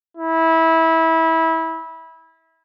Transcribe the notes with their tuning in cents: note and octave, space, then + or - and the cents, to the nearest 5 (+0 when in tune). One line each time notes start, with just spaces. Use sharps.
E4 -20